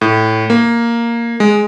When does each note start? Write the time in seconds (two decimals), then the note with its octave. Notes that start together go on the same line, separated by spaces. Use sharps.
0.01 A2
0.50 A#3
1.40 G#3